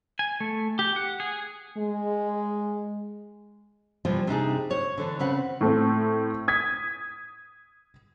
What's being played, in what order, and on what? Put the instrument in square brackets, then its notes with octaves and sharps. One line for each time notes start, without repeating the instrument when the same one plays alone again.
[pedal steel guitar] G#5
A3
G4
F#5
G#4
[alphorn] G#3
[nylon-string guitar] C3 E3 F3 G3
C3 D4 D#4 G#4
C5 C#5
D3 E3 D4
C#3 C4 B4 F#5
[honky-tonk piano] A2 A3 C4
D#6 G#6 B6